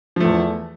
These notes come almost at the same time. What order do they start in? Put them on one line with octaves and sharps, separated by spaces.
F3 A3 E2